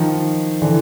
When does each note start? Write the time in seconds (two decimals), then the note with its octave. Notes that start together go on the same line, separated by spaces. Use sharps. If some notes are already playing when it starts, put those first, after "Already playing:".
Already playing: D#3 F3
0.62 D3 E3